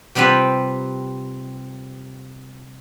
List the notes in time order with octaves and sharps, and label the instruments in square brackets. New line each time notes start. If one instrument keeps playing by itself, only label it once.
[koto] C3 G3 C4 F4 B4